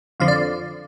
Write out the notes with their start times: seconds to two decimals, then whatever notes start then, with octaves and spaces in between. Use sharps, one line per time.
0.20 F2 D3 F3 F5
0.28 D5